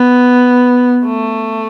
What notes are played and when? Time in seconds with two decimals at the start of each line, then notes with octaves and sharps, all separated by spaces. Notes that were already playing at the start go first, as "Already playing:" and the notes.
Already playing: B3
1.05 A3